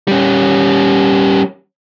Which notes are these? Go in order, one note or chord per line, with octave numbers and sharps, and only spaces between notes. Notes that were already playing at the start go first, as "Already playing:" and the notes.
G3 C#4